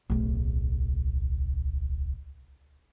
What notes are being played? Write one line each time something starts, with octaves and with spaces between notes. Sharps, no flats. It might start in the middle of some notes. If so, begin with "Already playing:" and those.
D1 B1